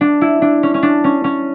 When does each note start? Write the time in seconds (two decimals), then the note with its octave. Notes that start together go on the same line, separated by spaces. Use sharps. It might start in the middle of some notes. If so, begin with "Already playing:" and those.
0.01 D4
0.21 E4
0.42 D4
0.63 C#4
0.74 C#4
0.83 D4
1.04 C#4
1.24 C#4